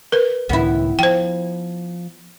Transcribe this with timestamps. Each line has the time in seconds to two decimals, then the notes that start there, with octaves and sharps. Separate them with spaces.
0.12 A#4 B4
0.49 C#2 A2 D#3 B3 E4
0.99 F3 C5 G5